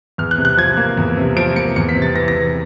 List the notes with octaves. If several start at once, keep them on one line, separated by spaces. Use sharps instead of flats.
E2 F6
F#6
C3
F#6
F3 G#6
A#3
E2
C3
F3 D7
A#3 C#7
E2 C#7
B6
C3
A6
E3 A#6
A#6
E2